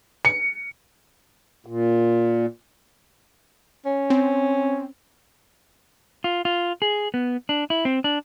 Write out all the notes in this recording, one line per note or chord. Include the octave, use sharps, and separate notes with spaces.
C#7
A#2
C#4
C4
F4
F4
G#4
B3
D4
E4
C4
D4